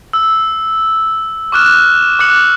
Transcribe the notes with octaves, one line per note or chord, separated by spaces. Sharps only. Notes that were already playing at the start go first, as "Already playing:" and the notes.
E6
C#6 D6 F6 F#6 E7
D6 F#6 C#7 F#7